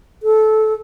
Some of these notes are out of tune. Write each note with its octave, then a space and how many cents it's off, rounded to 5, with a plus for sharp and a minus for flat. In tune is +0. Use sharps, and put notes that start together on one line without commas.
A4 -15